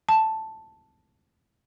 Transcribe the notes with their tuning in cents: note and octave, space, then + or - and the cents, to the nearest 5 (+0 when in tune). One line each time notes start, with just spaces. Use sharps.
A5 +0